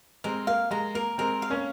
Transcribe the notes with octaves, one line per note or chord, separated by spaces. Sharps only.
G#3 C4 A#4
A#3 F5
G#3 A#5
A#3 A#4
G#3 C4 A#4
F5
A#3 C#4